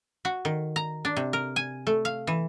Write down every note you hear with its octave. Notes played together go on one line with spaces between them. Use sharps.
F#4
D#3
A#5
D4
C3
A#4
G#5
A3
F5
E3